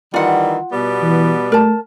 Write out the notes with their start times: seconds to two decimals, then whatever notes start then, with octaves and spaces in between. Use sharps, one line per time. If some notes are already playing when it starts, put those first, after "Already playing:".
0.14 D#3 E3 G3 F4 F#5
0.72 B2 G3 B3
1.02 E3
1.52 A3 A#4 A5